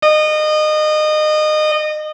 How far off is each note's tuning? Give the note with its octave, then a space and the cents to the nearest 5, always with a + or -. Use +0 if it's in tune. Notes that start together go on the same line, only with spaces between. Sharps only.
D#5 -25